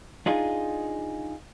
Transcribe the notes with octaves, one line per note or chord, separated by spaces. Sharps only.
D4 D#4 F4 G#4